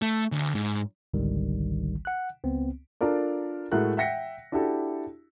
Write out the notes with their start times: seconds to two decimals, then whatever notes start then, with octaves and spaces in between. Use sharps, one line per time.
0.02 A3
0.32 D2
0.55 G#2
1.14 G#1 C#2 D3 D#3 G3
2.05 F#5 F#6
2.43 C#2 B3 C4
3.01 D4 F4 A4 A#4 D5
3.72 A2 G#3 A3 F#4 A#4 F#6
3.97 E5 F#5 G5 A#6 B6 C#7
4.52 D4 E4 F#4 G4 A4